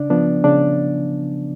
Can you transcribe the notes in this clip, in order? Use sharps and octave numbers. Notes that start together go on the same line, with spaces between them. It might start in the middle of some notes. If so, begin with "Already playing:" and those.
Already playing: C#3 D4 D5
F3 B3 D4
C#3 D4 D5